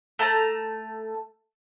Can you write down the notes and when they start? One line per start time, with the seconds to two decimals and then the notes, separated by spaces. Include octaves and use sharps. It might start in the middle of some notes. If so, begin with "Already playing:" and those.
0.19 A3 A5 A#5